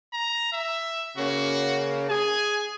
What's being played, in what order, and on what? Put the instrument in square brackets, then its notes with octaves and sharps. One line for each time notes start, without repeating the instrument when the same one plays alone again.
[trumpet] A#5
E5
[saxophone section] C#3 A#3 C#4 [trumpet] F#4
[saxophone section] G#4 [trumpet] G#5